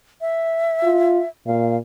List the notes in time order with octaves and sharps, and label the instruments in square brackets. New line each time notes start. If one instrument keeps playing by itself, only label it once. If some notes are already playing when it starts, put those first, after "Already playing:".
[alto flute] E5
[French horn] F4
[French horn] A#2 [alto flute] F5